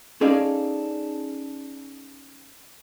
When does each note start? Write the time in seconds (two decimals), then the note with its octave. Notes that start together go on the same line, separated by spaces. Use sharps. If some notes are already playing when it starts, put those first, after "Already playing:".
0.21 C#4 D#4 G#4 A4 D5 F5